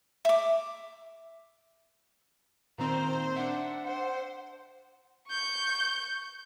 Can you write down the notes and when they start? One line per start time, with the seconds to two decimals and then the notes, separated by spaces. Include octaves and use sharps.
0.25 E5 D6
2.78 A#2 D#3 C4 C5 A#5
3.36 D4 E5 F#5
3.84 C5
5.28 C#6 G6